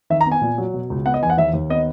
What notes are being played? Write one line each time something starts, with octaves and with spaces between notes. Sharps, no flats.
D#3 E5
A#5
B3
G#5
A#2
F#3
B2
C#2
B3 F#5
D#5
E2 G#5
F#5
D#2 E5
D#2
B3 D#5